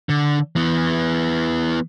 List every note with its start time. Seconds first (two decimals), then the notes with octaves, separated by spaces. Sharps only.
0.09 D3
0.56 E3 B3